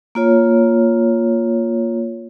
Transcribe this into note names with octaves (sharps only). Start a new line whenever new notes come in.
A#3 F4 C#5